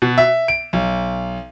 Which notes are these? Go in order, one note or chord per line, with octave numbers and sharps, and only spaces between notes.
B2
E5
D7
B1